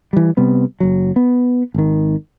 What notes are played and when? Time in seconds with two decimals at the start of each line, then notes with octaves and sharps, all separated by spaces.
0.13 E3 G3
0.37 C3 G3 B3
0.80 F#1 F#3
1.16 B3
1.74 G#1 D#3